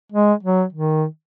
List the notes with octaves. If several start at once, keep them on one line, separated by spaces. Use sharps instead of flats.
G#3
F#3
D#3